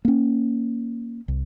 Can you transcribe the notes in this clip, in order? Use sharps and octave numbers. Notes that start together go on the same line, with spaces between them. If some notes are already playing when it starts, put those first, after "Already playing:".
A#3 C#4
C2